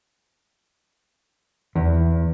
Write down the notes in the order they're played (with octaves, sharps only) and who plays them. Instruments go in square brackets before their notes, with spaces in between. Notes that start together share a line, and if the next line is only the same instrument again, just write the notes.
[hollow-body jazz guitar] E2